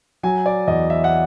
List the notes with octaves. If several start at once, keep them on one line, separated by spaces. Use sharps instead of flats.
F#3 G#5
D5
E2 D#5
E5
F#5